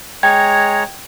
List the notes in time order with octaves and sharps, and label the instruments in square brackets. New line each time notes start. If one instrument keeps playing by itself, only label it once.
[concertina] G#3 C#5 A#5 [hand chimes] G5 G#6